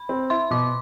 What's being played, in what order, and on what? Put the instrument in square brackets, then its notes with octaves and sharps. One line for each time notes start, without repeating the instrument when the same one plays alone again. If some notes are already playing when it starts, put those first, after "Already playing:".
Already playing: [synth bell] B5
[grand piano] C4
[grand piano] E4 [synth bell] C6
[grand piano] B2 [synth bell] D6